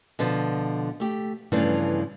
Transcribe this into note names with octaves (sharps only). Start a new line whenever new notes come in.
B2 D3 F3
A3 G4
G2 C#3 E3 F3 A3